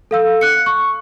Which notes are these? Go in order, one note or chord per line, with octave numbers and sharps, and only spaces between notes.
A4 F5 E6
F#6 C#7
C#6